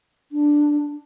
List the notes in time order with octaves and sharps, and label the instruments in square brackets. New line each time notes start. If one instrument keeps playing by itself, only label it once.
[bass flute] D4